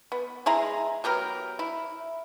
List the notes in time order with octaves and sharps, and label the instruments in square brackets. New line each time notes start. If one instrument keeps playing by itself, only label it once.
[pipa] B3
G#3 E4 G#4 A#5
F#3 B3 G4 A#4
E4